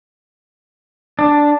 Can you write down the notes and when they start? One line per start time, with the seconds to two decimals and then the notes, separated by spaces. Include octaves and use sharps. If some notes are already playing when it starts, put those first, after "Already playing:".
1.19 D4